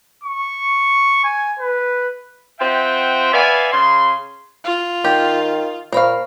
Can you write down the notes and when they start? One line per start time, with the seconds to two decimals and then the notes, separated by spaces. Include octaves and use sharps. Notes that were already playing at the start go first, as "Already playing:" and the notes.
0.23 C#6
1.24 G#5
1.59 B4
2.59 C4 F4 E5 F#5 G5
3.32 B3 D5 E5 F5 G#5
3.72 C#3 C6
4.65 F4
5.04 D#3 G4
5.92 A#2 A#3 C5 F5 B5 C#6